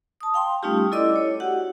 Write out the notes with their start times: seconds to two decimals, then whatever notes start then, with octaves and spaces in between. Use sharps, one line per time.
0.21 A5 D#6
0.34 F5 G5 C6
0.63 G3 A3 C#4 D#4 F4 G4
0.92 E4 A4 D5 D#5 D6 E6
1.16 C#5
1.40 F#4 G4 F#5